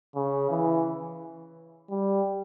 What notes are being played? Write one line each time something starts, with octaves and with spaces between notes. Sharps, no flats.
C#3
E3
G3